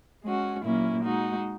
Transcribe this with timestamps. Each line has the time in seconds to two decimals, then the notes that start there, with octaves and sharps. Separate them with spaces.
0.24 G#3 C#4 F#4
0.64 A#2 F#3 A#3 C#4 E4
1.04 G#3 D#4 F#4